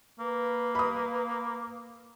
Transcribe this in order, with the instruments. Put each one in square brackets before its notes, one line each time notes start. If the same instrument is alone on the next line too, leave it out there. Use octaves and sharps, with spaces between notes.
[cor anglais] A#3 [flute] B4
[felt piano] B5 D#6